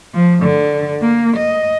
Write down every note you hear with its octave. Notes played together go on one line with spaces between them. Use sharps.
F3
D3
A#3
D#5